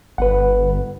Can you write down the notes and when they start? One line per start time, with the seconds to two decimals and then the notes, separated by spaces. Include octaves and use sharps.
0.18 G1 B4 F#5